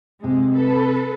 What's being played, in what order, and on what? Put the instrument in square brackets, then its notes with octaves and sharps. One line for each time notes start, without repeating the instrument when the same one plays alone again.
[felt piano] C3 [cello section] G#3
[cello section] A4 B4